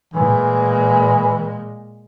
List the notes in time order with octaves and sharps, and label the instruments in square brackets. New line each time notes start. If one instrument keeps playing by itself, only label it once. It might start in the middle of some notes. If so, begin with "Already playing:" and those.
[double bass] A#2 G#3 [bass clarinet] E3